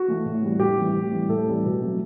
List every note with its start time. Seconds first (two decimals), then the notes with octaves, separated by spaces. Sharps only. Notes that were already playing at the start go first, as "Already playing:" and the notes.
Already playing: F#4
0.08 E3 A3
0.26 A2
0.43 E3 G3
0.59 A2 G4
0.78 E3 G3
0.95 A2
1.11 E3 G3
1.29 A2 A4
1.47 E3 G3
1.64 B2
1.81 F#3 A3